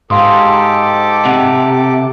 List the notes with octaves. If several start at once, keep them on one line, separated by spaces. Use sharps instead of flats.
G#2 G4 A4 F5 C6 D6 D#6
C3 F#5